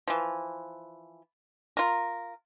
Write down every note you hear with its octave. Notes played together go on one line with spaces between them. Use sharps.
E3 F3
F4 A#4